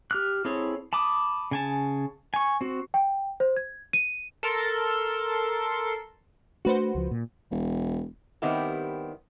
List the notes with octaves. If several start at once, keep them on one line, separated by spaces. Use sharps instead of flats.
G4 F6 F#6
C4 E4 G#4 A4 C#5
A5 B5 D6 D#6
C#3 G#5 A5
G#5 C#6
C4 F#4
G5
C5
G#6
D#7
A4 A#4 C6
A3 D4 F#4 B4 C5
C#2 F3
A#2
E1
D#3 G3 B3 C4 E4 G4